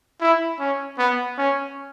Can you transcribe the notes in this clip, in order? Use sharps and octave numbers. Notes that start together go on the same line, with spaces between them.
E4
C#4
B3
C#4